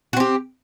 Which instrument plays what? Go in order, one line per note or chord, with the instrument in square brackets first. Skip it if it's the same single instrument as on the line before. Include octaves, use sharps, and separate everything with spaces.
[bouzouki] F#4
C4
G4